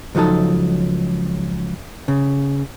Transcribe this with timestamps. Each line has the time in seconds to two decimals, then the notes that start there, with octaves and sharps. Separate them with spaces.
0.15 C#2 F3 F#3 D#4 A4
2.08 C#3